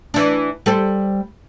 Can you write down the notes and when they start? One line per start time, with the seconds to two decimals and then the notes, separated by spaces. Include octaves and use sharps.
0.14 E3 D4
0.66 G3 A4 C5